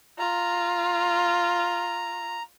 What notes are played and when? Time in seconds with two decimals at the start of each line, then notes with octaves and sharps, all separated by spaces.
0.19 F4 A#5